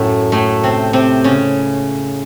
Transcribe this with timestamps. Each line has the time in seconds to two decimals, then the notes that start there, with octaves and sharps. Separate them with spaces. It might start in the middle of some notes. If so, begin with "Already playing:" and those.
Already playing: F#2 A2 F#3 A3
0.32 A2 A3
0.63 C3 C4
0.93 C3 C4
1.24 C#3 C#4